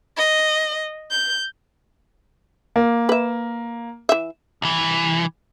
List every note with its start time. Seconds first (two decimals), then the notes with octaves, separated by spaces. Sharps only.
0.17 D#5
1.11 G6
2.76 A#3
3.09 B4 E5
4.09 E3 E5
4.62 C2 E3